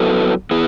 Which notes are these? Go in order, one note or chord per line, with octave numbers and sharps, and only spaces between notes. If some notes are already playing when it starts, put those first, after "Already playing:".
Already playing: F#3 B3 E4 A4
B3 E4 G#4